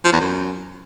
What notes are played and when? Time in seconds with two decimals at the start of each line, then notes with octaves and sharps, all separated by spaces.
0.05 F3
0.13 E2
0.21 F#2